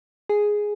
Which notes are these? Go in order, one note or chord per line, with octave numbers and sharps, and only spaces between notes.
G#4